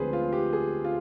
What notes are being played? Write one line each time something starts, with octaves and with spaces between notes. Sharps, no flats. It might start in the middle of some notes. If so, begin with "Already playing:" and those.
Already playing: D2 D3 F3 G#3 C4 G#4 B4 C5
F4
G4
G#4
F4